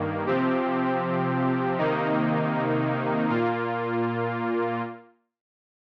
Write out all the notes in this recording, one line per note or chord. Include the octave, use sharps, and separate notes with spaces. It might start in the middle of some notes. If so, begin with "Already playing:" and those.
Already playing: G2 D#3 A#3
C3 F3 C4 G4
C3 D#3 A#3 D#4
A#2 A#3 F4